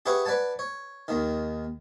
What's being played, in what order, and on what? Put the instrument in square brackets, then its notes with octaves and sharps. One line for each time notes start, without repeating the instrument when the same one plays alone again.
[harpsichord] G4 G#4 B4 C#5 E5 F#5
B4 D5 F#5 G#5 A5
C#5
D#2 D#3